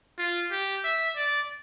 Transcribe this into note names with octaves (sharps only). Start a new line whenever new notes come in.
F4
G4
E5
D5